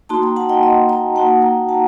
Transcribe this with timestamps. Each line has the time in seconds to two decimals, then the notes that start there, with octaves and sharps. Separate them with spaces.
0.09 A#3 D#4 F#4 A5 C6
0.22 G5 A#5
0.36 F#5 A5
0.49 D#5 G5
0.63 D#5 G5
0.89 G5 A#5
1.15 A#3 D#4 F#4 F#5 A5
1.42 G5 A#5
1.69 F#5 A5